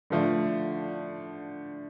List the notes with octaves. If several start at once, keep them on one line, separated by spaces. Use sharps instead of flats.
D3 F3 A3 D4